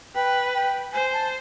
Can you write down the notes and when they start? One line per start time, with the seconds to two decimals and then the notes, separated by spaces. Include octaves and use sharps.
0.15 B4 G5
0.55 G5
0.93 C5 G#5
1.13 A5